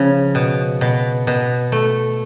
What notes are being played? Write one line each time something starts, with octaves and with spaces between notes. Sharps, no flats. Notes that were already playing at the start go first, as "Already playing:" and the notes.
Already playing: C#3 F3
B2
B2
B2
A3